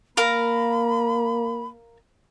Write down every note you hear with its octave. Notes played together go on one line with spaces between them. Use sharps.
A#3 A#4 F5 A#5 B5